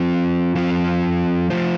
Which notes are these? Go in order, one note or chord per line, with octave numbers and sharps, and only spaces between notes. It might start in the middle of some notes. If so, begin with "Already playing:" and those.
Already playing: F3 C4 F4
F3 C4 F4
F3 A3 F4 C5